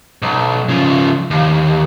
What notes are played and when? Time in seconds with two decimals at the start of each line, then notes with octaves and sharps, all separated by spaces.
0.22 B1
0.69 C#3 F3
1.31 D#2